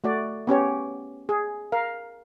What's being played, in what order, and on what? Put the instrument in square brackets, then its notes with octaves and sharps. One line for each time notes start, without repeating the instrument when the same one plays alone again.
[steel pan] A3 F#4 D5
B3 C#4 G4 C#5
G#4
A#4 F5